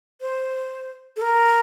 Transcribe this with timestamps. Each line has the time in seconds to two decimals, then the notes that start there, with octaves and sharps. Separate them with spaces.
0.21 C5
1.16 A4
1.22 A#4